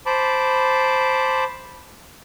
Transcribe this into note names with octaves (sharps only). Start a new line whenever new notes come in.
C5 A5 B5 D6